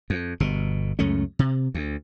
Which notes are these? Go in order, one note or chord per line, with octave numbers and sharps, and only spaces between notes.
F2
G1 B2
C#2 F#2 A3 C#4
C3
D2